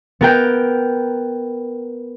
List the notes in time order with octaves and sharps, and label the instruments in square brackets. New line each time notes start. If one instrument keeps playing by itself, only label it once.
[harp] B3 A#4 G5